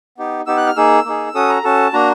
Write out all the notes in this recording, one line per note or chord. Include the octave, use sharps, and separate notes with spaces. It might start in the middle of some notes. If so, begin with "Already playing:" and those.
B3 D#4 G4
B3 D#4 G4 E6
F#6
F6
A#3 D#4 G#4 E6
A#3 D#4 G#4
C#4 F#4 A4 D#6
A#5
C#4 F#4 A4 A5
A#3 D4 F#4 A#5